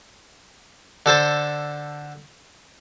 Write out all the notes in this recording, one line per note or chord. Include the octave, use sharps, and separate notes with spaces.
D3 A4 C5 A5